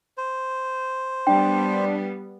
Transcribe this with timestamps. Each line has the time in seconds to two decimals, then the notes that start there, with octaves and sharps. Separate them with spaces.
0.18 C5
1.27 G3 B3 D4 G5